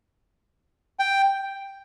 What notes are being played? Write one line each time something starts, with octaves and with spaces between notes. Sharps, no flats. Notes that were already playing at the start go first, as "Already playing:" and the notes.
G5